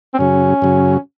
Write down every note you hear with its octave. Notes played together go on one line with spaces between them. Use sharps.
C4
F#2 C#3 F#3 C#4
F#2 C#3 F#3